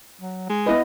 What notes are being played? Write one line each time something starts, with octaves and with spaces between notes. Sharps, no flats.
F#3
G#3
B3 E4 B4 D#5